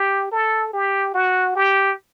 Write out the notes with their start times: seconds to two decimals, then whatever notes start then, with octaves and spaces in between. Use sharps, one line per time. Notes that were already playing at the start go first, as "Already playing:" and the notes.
Already playing: G4
0.32 A4
0.73 G4
1.14 F#4
1.56 G4